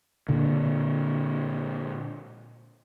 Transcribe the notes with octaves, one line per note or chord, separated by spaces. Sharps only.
A#2 D3